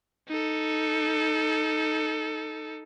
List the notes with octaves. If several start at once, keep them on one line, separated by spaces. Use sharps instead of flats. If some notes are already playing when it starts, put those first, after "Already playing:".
D#4 A4